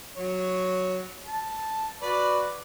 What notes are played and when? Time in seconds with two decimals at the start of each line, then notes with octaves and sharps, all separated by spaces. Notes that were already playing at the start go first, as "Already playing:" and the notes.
0.17 F#3 C#5
1.26 A5
2.02 F#4 B4 D5